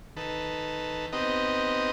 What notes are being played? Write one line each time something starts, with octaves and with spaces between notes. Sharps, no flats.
D#3 A4 B4
B3 C4 D#4 G4 D#5